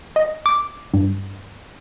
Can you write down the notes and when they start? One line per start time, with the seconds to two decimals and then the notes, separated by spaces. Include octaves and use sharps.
0.16 D#5
0.46 D6
0.94 G2